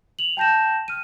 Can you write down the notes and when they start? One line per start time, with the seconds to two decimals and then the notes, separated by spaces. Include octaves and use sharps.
0.19 F7 F#7
0.37 G5 A5 G6 A#6 E7
0.88 F6 D#7